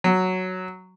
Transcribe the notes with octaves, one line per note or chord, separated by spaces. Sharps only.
F#3